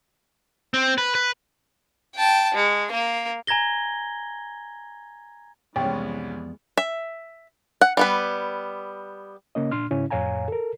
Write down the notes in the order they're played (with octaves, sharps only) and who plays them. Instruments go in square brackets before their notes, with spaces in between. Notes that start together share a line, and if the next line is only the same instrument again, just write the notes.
[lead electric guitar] C4
B4
B4
[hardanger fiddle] G5 A5
G#3
A#3 A#4
[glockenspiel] G#5 A#5 G#6 A#6 G7
[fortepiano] C2 C#4 [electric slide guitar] F2 B3 D5 [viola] E3 G#3 [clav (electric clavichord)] G5
[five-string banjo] E5
F#5
G3 B3 B4
[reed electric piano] C#3 A#3 C#4 D#5
A#2 D4 C6 F6
G#2 C#3 C#4 E4
F2 A2 C#5 F5 G#5 A#5
A4 A#4